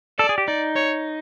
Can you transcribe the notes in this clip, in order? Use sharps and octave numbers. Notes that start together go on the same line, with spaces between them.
A4 D5
G#4
G4
D#4 D5
C#5